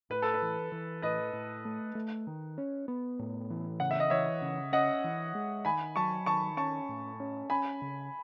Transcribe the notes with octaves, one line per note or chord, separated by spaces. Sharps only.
A2 B4
A4
B4
E3
E3
A2 B4 D#5
A2
A3
A3
D#3
C#4
B3
A2
E3
C#3 F#5
E5
D#5
E3 C#5 E5
C#3
C#4 D#5 F#5
E3
G#3
D#3 G#5 B5
F#3 A5 C#6
D#3 A5 C#6
C#4 A5 C#6
A2
C#4
C#4 G#5 B5
C#3